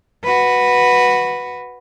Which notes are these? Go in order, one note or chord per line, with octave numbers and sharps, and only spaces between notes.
F#4 B4